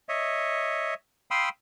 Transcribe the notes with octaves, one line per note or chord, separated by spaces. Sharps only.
C#5 D#5 E5
F5 G5 B5 C6 D#6 E6